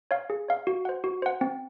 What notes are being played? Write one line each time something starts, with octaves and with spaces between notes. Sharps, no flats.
C#5 F5
G#4
C#5 F5
F#4
C5 F#5
F#4
C5 F#5
C4